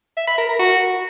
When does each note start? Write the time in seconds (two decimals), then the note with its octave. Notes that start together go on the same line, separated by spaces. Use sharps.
0.17 E5
0.28 B5
0.38 A#4
0.49 A#4
0.59 F#4